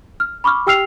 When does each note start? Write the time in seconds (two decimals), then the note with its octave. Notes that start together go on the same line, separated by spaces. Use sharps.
0.20 F6
0.44 B5 C#6 D6 F6
0.67 G4 G5 E6 F6 C7 F7